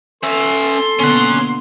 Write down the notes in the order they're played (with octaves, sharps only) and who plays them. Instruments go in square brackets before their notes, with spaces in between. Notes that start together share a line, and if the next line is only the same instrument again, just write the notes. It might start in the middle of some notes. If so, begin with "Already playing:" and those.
[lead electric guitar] C#4 E5 [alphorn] A4 [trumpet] C6
[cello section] B2 D3 A#3 [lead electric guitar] C#4 F#5